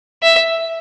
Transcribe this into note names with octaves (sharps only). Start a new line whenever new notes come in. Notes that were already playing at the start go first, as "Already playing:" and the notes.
E5